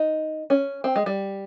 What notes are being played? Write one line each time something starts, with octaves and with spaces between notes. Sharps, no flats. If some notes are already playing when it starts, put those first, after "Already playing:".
Already playing: D#4
C#4
C4
G#3
G3